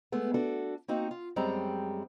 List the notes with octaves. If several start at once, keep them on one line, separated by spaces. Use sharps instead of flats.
G#3 A3 B3
D4 F#4 A4
A#3 C4 D#4 F#4
F4
F#2 G3 G#3 C4 A#5